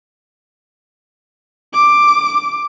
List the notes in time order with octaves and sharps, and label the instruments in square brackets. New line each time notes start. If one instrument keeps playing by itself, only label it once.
[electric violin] D6